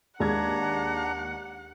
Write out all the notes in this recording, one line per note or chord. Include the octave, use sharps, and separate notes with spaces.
D#2 G#3 D4 F#5 A#5 G#6